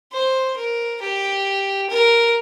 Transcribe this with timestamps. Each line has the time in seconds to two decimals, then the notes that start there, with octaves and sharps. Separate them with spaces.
0.12 C5
0.57 A#4
1.01 G4
1.90 A#4